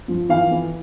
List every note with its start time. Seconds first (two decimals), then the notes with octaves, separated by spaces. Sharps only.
0.08 F3
0.29 E3 F5
0.51 E3